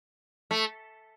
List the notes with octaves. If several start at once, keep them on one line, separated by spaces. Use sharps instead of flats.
A3